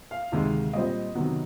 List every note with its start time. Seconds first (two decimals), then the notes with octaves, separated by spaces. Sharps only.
0.11 F5
0.32 D2 C3 D#3 G#3
0.73 A#2 G3 C4 D#5
1.15 C3 D#3 F#3 B3